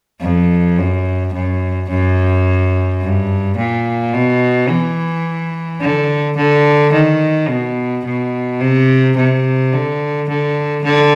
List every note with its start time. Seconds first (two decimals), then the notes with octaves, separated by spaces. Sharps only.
0.21 F2
0.78 F#2
1.34 F#2
1.89 F#2
3.02 G2
3.57 A#2
4.13 B2
4.69 E3
5.81 D3
6.37 D3
6.92 D#3
7.48 B2
8.04 B2
8.61 C3
9.17 C3
9.73 D3
10.29 D3
10.84 D3